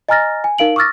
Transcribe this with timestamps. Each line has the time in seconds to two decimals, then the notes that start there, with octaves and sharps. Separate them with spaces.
0.09 D#5 G#5 A#5 F6 A6 A#6
0.44 G#5
0.58 D#4 A#4 F5 D7 F#7
0.76 C#6 D6 E6 F6 A6 A#6